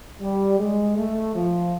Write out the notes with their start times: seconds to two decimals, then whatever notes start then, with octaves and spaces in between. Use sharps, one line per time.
0.21 G3
0.59 G#3
0.97 A3
1.34 F3